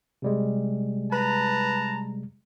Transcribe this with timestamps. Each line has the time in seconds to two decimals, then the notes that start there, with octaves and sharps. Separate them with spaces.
0.22 C3 G3 G#3
1.12 B4 A5 A#5